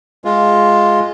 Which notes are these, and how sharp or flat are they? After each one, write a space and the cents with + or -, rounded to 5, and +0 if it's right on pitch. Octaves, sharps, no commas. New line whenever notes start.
G#3 +0 F4 +0